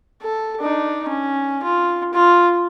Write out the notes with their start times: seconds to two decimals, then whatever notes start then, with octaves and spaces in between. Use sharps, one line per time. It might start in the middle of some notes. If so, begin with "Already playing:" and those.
0.22 A4
0.60 D4 D#4
1.08 C#4
1.63 F4
2.14 F4